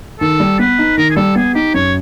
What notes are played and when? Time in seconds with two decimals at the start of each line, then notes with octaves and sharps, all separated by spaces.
0.20 D#3 A4
0.40 G3
0.59 B3 B4
0.79 D#4
0.97 D#3 A#4
1.10 G#4
1.16 G3 A4
1.35 B3 G#4
1.54 D#4 G4
1.74 F#2 C#5